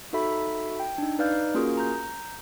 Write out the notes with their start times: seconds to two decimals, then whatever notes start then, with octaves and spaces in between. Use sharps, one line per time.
0.13 D#4 F#4 A4 E5 B5
0.80 G5
0.98 D4 D#4
1.19 D#4 B4 D5 F5 F6 G6
1.54 A#3 C#4 F4 F#4 G#4 A#4
1.77 A#5 G6